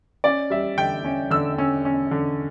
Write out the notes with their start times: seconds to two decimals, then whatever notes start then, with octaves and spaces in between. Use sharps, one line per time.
0.24 C#4 D5
0.50 G3 E5
0.78 D3 G5
1.05 C#4
1.30 D3 E6
1.58 C#4
1.85 C#4
2.11 D3